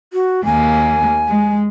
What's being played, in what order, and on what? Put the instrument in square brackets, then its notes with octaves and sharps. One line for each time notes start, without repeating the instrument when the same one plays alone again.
[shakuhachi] F#4
[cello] D#2 A#3 [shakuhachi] G#5
[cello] G#3